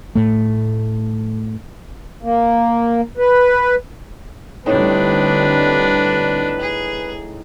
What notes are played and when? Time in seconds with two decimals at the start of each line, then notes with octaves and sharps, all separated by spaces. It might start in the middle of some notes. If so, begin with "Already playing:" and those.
0.15 A2 A3
2.23 A#3
3.18 B4
4.66 A2 D3 G3 C4 D4 D#4 B4
6.61 G#4